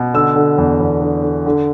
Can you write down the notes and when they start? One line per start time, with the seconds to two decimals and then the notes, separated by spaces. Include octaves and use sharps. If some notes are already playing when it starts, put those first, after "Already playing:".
Already playing: B2
0.14 D3 E6
0.36 D3
0.58 E2
0.81 E2
1.02 D3
1.23 D3
1.46 D3